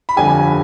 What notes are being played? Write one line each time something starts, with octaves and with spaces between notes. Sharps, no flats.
B5
G1 F2 D3 G3 G#5